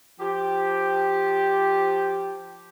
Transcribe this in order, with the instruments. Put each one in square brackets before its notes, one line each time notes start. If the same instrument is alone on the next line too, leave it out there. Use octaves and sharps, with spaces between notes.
[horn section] F3 G4